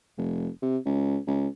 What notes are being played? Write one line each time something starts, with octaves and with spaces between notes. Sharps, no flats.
F1
C3
C#2
C#2